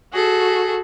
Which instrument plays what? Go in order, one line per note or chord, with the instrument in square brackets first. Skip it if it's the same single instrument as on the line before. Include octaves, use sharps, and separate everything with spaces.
[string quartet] F#4 G#4 A4